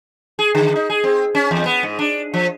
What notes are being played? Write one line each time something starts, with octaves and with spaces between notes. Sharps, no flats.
G#4
D3
D#4
G#4
C4
C#4
E2
B3
G#2
D4
F3